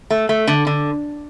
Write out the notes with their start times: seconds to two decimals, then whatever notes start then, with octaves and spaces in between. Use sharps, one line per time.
0.10 A3
0.29 A3
0.47 D3
0.67 D3